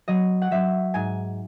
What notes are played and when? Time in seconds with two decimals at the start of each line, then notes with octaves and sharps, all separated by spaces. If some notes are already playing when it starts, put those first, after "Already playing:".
0.08 F#3 D#5
0.42 F#5
0.51 F#3 E5
0.94 G#2 G#5